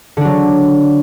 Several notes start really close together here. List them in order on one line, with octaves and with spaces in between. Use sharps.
D3 D4 F#3